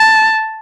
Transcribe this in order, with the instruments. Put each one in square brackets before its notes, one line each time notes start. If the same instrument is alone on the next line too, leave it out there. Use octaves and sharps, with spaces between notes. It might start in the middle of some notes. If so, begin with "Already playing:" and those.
Already playing: [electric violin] A5